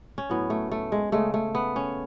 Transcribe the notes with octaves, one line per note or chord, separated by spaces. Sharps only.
C#4
A2 F#3 B3
A3
A3
G#3
C#3 G#3 A3
A3
B3
C#4